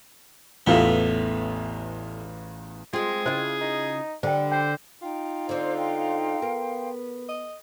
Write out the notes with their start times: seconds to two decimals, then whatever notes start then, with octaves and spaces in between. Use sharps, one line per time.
0.67 A1 E2 A2 B3 F4
2.93 G#3 C4 F4 G#4
3.26 C#3 E4 F4 C5 D#5
3.61 D#4
4.23 D3 G3 C5 G5
4.52 C5 G5
5.02 D#4 F4 G5
5.49 D3 C4 C5 D6
5.78 F5 G5 C6
6.42 B3 A#4
7.29 D#5